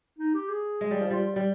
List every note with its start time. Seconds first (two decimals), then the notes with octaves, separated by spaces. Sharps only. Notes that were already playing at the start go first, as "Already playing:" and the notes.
0.18 D#4
0.34 G4
0.49 G#4
0.81 G#3
0.91 G3
1.01 F3
1.10 G3 F4
1.36 G3